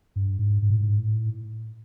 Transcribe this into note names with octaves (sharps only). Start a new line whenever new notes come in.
G2
G#2
G#2
A2
G#2
A2